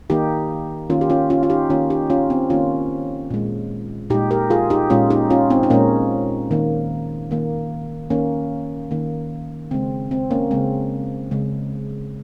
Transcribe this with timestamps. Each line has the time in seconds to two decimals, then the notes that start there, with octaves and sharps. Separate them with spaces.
0.10 D#3 A#3 D#4 G4
0.90 D#3 A#3 C#4 F4
1.01 G4
1.10 C#4 F4
1.30 C#4 F4
1.43 F4
1.50 D#4 G4
1.70 D#3 A#3 C#4 F4
1.90 D#4 G4
2.10 C#4 F4
2.30 C4
2.50 D#3 A#3 C#4 F4
3.30 A#2 G#3
4.10 A#2 G#3 D#4 G4
4.31 G4 A#4
4.50 F4 G#4
4.70 D#4 G4
4.90 A#2 G#3 C#4 F4
5.10 D#4 G4
5.30 C#4 F4
5.50 C4 D#4
5.63 D#4
5.70 A#2 G#3 A#3 C#4
6.51 D#3 A#3
7.31 D#3 A#3
8.10 D#3 A#3 C#4
8.91 D#3 A#3
9.71 C#3 G#3 C4
10.11 C4
10.31 A#3 C#4
10.51 C#3 G#3 C4
11.31 C#3 G#3